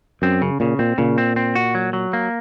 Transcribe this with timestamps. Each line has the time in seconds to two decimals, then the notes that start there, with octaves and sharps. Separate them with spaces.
0.22 F#2 C4
0.42 C#3
0.60 A#2 C#3
0.79 A#2 C4
0.98 A#2 C#3
1.18 C4
1.36 C4
1.55 F#4
1.75 F#3
1.93 F#3
2.13 A#3